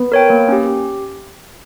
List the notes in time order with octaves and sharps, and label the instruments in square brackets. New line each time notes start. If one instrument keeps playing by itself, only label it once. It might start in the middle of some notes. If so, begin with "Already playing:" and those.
Already playing: [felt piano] B3
[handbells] A#4 C#5 G5
A#3
C#4 G4
G4